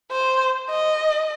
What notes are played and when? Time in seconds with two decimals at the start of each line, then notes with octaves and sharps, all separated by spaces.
0.12 C5
0.71 D#5